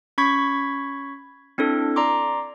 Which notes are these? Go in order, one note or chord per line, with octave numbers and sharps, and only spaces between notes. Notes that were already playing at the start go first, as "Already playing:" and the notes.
C#4 B5 C#6 G#6 B6
C4 D4 E4 A4
D5 A#5 C6 D6